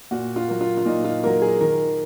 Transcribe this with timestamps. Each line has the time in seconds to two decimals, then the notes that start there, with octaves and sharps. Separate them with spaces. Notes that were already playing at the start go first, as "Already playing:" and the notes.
0.11 A#2 F#4
0.36 F4
0.48 F#3 A#3
0.61 F4
0.77 F4
0.85 A#2 D#4
1.04 F4
1.23 F#3 A#3 A#4
1.42 G#4
1.61 D#3 A#4